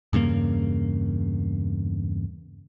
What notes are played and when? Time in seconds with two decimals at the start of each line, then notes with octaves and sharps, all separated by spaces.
0.13 E2 G2 C#3 A#3